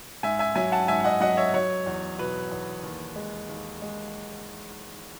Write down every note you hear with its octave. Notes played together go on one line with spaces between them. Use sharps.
G#2 E5 G#5
E5 G#5
F#3 E5 G#5
F#5 A5
G#2 E5 G#5
D#5 F#5
F#3 D#5 F#5
C#5 E5
F#3 C#5
E2
B2 B4
E2
D#2
G#3
D#2
G#3